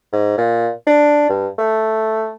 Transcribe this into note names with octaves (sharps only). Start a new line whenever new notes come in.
G#2
A#2
D4
G2
A3